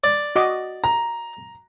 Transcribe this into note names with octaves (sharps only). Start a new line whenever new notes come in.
D5
F#4 D#5 D6
A#5